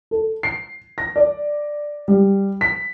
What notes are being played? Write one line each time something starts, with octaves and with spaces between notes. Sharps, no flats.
A4
C7
A#6
D5
G3
B6